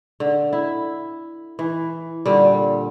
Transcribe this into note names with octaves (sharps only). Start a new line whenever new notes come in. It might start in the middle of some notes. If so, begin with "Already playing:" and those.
D3
E4
E3
A#2 D3 G3